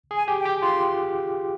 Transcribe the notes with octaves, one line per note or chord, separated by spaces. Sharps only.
G#4
G#5
G4
G5
G4
F4 C6